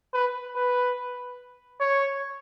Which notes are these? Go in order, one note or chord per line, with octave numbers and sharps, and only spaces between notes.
B4
B4
C#5